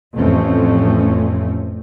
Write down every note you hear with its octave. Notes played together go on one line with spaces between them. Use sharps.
A1 F2 A3 C4 C#4